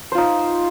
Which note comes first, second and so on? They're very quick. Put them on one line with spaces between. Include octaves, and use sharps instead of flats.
C5 F4 D#4